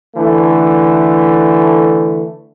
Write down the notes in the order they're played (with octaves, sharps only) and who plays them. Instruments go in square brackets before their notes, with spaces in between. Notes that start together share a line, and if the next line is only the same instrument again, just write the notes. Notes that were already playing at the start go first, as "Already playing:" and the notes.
[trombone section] D3 E3 A3